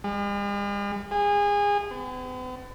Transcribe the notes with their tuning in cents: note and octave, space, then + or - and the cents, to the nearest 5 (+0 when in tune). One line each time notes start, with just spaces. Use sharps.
G#3 -45
G#4 -25
B3 +45